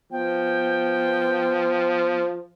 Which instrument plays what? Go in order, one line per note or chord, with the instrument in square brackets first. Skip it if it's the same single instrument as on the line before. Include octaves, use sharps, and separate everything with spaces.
[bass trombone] F3 [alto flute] B3 [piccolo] G5